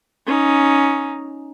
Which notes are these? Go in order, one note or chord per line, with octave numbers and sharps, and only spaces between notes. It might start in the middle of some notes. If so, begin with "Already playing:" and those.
C#4 D#4